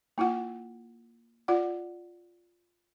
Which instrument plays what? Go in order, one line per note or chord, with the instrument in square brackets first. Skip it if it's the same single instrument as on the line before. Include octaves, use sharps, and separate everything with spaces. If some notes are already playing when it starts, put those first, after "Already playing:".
[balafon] A#3 E4 F4 F#5
F4 D5 F#5